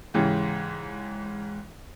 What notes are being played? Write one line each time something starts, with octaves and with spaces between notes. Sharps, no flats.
G#2 C#3 E3 G4